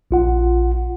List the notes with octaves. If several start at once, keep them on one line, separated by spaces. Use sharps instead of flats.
A#1 F4 F#5